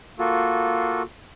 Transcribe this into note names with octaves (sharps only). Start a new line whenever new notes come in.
A#3 F4 F#4 A4